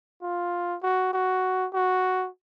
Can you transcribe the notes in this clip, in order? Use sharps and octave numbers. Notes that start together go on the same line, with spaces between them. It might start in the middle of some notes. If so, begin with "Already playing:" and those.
F4
F#4
F#4
F#4